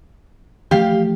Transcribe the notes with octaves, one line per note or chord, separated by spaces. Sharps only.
E3 F3 A3 G4 F5